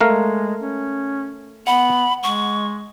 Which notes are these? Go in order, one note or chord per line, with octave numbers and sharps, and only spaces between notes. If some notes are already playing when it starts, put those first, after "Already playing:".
G#3 A3 A#4 F5
C#4
B3 F#5 B5
G#3 C#6